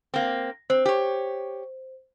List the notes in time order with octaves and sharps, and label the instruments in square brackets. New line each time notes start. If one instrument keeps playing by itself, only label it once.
[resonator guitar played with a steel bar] A#3 C4
[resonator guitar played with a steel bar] C4 [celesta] C5
[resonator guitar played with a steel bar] G4 C#5